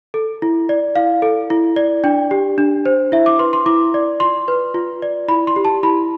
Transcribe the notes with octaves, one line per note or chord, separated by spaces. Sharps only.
A4
E4
D5
E4 F5
A4
E4
D5
D4 G5
G4
D4
C5
E4 E5
D6
B4 C6
C6
E4 D6
D5
F4 C6
B4
F4
D5
E4 B5
C6
G4
A5
E4 B5